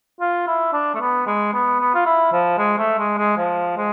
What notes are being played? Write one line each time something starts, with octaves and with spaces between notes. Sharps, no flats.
F4
E4
D4
A3
B3
G#3
B3
B3
F4
E4
F3
G#3
A3
G#3
G#3
F3
G#3